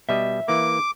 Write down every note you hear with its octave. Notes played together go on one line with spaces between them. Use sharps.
B2 G3 D#5 E5
E3 A#3 D6